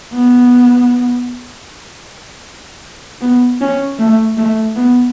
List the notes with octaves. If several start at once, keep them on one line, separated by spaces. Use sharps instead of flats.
B3
B3
C#4
A3
A3
B3